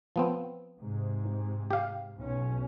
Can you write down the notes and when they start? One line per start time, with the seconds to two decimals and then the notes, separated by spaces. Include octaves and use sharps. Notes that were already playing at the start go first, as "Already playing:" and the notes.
0.16 F3 B3 C4
0.79 G#2 C3
1.70 G4 F5
2.17 B1 B2 C#4